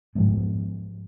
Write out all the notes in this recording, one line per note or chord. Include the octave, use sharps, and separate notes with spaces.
G#2 F3 G#3 B3